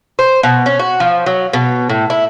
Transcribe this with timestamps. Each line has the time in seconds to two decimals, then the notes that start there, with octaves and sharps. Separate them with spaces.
0.19 C5
0.43 B2
0.66 C#4
0.79 F#4
1.00 F3
1.26 F#3
1.53 B2
1.89 A2
2.10 E4